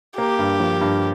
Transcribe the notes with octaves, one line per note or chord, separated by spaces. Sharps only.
A#3 G4
G2
F3
G2